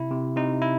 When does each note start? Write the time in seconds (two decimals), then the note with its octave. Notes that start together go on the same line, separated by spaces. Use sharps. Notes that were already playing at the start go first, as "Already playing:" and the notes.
Already playing: C3 E4
0.11 C3
0.36 C3 D#4
0.62 E4